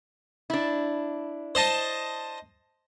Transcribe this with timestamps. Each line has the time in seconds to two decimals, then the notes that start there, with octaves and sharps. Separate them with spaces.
0.50 D4 E4
1.55 C5 D#5 A5